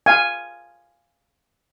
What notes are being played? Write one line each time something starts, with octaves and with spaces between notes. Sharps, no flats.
F5 G#5